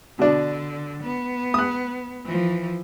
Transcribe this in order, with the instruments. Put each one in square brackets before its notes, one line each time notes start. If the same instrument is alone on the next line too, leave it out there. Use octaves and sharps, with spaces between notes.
[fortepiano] B2 D4 [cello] D3
[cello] B3
[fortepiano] D#6 F#6
[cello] E3 F3